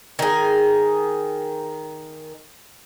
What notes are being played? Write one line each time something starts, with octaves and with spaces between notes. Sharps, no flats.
D#3 G#4